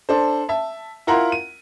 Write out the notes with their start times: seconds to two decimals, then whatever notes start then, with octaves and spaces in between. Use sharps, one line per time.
0.09 D4 A4 C5
0.49 E5 A5
1.07 E4 F4 A#4 F#5 A#5 C6
1.32 D#7